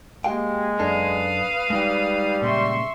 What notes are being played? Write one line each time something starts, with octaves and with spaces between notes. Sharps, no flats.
G#3 A#3 G4 F5 G5
F#2 D4 A4 B4 F5 D#6
G3 G#3 D#4 G5
A#2 C#3 G#3 E5 C6 C#6